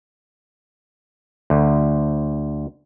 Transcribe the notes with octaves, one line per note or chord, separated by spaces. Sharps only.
D2